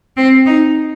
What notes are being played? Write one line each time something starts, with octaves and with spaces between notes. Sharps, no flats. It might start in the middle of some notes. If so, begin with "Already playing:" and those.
C4
D#4